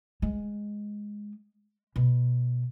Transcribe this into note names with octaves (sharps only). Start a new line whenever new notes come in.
G#3
B2